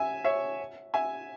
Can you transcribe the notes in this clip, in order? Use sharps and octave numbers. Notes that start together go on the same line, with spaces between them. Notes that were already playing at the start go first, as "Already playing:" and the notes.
Already playing: E5 G#5
C#5 E5
E5 G#5